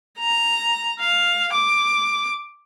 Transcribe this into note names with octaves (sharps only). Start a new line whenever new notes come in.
A#5
F5
D6